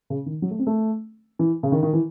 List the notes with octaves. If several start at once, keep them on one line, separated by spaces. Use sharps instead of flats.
C#3
D#3
F#3
A3
C4
A3
E3
C#3
D#3
D#3
E3